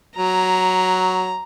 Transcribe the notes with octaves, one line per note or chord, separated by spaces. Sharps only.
F#3 A#5